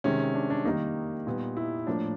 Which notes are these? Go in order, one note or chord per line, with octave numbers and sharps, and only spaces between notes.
C3 D#3 G#3 C#4
D4
D4
D#3 G3 A#3 D#4
A#2 G3 B3
E4
A2 F3 A#3 D4